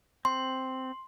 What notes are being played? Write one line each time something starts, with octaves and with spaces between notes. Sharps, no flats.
C4 C6